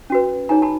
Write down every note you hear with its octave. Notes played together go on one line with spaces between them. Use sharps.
C#4 F#4 B4
D#4 G#4 C#5 G#5 A#5
A5 B5